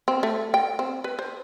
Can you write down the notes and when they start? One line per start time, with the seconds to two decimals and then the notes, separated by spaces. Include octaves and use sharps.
0.08 C4
0.23 A3
0.54 G5
0.79 C4
1.04 B4
1.19 C5